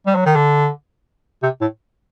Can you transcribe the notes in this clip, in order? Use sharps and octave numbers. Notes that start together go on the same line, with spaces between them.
G3
F#3
D#3
D3
C3
A2